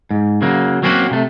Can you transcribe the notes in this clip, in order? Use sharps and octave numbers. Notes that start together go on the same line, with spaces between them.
G#2
C#3 F#3 A#3
F#3 A#3 C4 C#4 F4 F#4
C3 A3